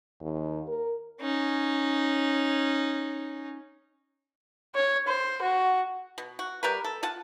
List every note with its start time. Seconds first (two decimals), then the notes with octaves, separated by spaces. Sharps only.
0.21 D#2
0.68 A#4
1.21 C#4 D#4
4.75 C#5
5.07 C5
5.43 F#4
6.18 B2
6.39 F#4
6.63 G3 A#4 B4
6.84 A4
7.03 F4 F#5 A5